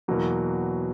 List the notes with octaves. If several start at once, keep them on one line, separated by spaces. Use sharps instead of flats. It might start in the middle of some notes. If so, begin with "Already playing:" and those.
E2 B2 F#3 A#3